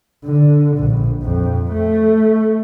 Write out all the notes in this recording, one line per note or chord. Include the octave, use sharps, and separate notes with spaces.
D3
A#1
F2
A3